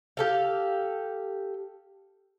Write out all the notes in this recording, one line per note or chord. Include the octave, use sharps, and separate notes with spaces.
G4 A4 F5